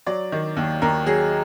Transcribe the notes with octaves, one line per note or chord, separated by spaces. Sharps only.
F#3 D5
D#3
D#2
D#2 A#4
F#3 G#4